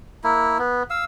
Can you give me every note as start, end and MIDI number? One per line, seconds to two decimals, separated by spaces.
0.24 0.58 58
0.24 0.58 64
0.59 0.83 59
0.90 1.05 77
0.90 1.05 88